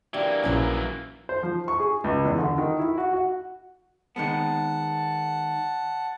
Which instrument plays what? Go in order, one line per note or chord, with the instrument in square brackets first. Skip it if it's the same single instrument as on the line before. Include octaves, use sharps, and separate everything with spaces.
[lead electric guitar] E3 A#3 [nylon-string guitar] D4 F4 G4
[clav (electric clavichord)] A#1 C#4 [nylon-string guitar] F#3 E4 F4
[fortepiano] C5
F3
C#6
G#4
C#2
E2
D3
D#3
E4
F#4
F#4
[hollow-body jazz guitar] D#3 G#3 B3 [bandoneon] F#5 A5